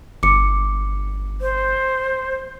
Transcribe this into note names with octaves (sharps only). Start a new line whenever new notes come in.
G1 D6 C#7
C5